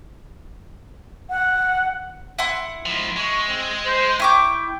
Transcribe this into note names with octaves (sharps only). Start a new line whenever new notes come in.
F#5
E4 F#5 C6
G#2 F3
G#3 C#6
C4
C5
E4 G5 C#6 D6